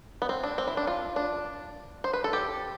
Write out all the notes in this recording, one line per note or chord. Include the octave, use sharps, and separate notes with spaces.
B3
C4
D4
C4
E4
D4
F4
D4
C5
B4
A4
G4